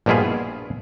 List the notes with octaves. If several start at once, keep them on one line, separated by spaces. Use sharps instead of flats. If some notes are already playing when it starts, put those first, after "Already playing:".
A#1 G2 B2 E4 F4 G#4